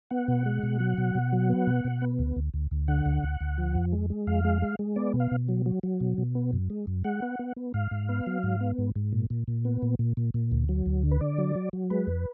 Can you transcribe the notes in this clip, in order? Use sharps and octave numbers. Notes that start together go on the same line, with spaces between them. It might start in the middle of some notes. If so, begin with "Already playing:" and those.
B3 F#5
B2
G#3
B2
F#3
B2
B2
F#3
B3
B2
B2
B3
D2
D2
D2
D2
D3 F#5
D2
D2
D2
F3
F2
G#3
G#3
F2 F5
G#3
G#3
G#3
B3 D5
B2
F5
B2
F#3
F#3
F#3
B2
B2
B3
F#2
G#3
F#2
G#3 F#5
B3
B3
B3
G#2 F5
G#2
B3
F#3
G#2
B3
G#2
G#2
A#2
A#2
A#2
B3
A#2
A#2
A#2
A#2
D2
F#3
D2
D3
B4
D3 D5
F#3
F#3
F#3
G#3 B4
F2